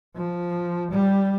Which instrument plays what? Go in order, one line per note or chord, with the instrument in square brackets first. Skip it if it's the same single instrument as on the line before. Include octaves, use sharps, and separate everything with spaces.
[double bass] F3
G3